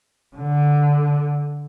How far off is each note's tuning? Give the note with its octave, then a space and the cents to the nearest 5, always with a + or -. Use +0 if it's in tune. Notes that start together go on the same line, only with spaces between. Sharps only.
D3 -5